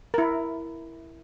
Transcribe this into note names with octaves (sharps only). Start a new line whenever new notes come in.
E4 A#4